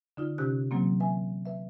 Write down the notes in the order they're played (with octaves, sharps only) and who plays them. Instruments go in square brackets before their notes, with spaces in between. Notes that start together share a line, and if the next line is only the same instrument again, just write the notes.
[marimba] D3 D#4 F4
C3 C#4 G4 F#6
C3 E3 F#3 A#3 C4
B4 E5 G#5
B4 E5